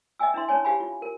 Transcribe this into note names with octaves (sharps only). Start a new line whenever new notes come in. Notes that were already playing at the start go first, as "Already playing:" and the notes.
D#5 E5 G5 G#5 E6
D4 E4 E5 C6
C#4 D#4 C#5 G#5
G4 F5 G#5 B5
F4
A#4